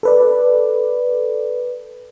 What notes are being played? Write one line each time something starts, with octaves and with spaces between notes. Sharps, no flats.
A4 B4 D5